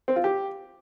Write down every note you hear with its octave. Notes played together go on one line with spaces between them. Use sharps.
C4
F4
G4